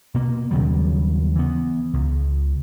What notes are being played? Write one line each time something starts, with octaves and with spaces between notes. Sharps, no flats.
B2 A#3
D#2 C#3 F#3 G3
E3 B3
C#2